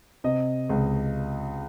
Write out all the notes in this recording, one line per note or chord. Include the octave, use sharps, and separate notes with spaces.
C3 D#5
C#2